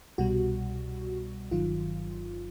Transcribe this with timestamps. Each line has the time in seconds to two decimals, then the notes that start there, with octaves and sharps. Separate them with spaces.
0.18 C2 B2 G3 F#4
1.51 G1 G2 D#3 F#3 F4